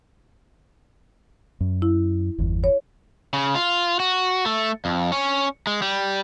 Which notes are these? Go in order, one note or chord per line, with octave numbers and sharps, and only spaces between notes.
F#2
E4
G1 E2
C#5
C#3
F4
F#4
A3
F2
C#4
G#3
G3